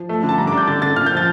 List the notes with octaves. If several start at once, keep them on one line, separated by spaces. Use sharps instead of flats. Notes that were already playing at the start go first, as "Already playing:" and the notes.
Already playing: F3
A3
D3
A5
G3 A#5
D6
D4
G6
D3 A6
D3 A6
A#2 F6
G6
F3
A6